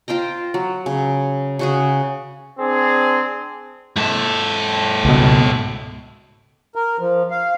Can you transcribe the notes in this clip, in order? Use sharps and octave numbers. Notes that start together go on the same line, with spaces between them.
F4 C5 G5 A#5
F#3
C#3
C#3 F#4 G#4
C4 D4 G#4
G#2 A4
C#2 B2
A#4
F3
F5